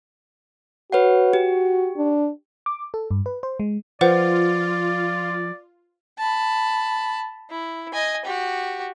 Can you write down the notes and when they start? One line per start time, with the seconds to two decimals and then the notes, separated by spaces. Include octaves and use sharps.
0.92 F#4 B4 C#5 F#5
1.33 G4
1.97 D4
2.66 D6
2.94 A4
3.11 G2
3.26 B4
3.43 C5
3.60 G#3
4.01 F3 F4 B4 C5 D5 F#5
6.19 A5 B5
7.50 E4
7.93 D#5 G#5
8.25 F#4 G4